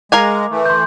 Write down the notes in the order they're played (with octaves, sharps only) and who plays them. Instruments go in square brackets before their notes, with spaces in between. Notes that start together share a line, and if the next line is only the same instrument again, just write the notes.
[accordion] G#3 [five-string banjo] A#4 F5 G#5 [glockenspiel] D6
[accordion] E3 A3
[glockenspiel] C6 G6